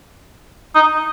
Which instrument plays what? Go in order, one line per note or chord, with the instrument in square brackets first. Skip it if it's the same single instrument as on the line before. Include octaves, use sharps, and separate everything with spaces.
[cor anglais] D#4